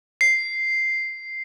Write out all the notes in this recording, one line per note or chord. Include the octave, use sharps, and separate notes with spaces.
C7